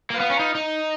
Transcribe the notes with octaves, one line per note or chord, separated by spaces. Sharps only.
A#3 F4 B4 F5
B3
C#4
D#4
D#4